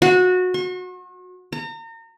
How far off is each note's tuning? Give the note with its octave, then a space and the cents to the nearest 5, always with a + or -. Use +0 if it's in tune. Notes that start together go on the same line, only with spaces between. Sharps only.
F#4 -20
C#6 -45
A#5 -35